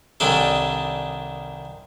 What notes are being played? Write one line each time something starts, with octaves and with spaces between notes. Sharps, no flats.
C2 D#3 C#4 D4 A4